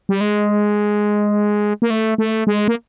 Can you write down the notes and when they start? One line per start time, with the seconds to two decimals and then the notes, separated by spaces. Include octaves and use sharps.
0.09 G3
0.21 G#3
1.82 A#3
1.90 A3
2.18 A3
2.47 G#3
2.68 A#3